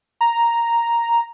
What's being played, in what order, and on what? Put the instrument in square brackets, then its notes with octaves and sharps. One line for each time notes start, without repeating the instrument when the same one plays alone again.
[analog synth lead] A#5